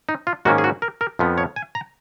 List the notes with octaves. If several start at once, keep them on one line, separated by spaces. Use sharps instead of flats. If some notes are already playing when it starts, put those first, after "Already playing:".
D#4
F4
G#2 D#3 A#3 C#4 F#4
G#4
F#4
A#4
A#4
F2 F3 B3
C#5
G#5
A#5